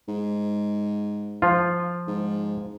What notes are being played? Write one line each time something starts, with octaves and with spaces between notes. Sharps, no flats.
G#2
F3 F4
G#2